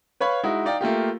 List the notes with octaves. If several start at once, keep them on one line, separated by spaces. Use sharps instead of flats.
B4 C#5 F5 B5
G#3 D#4 E4 F#4
D#4 D5 F5 G5
A3 A#3 F4 G4